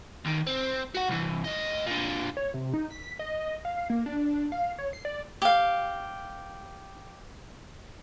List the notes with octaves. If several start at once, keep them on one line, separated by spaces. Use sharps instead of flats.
D#2 D#3
C4
F#4 F#5
C2 E3
D2 D#5
A#2 D3
C#5
C3
D#4
B6
D#5
F5
A#3
D4
F5
C#5
C7
D5
G4 F5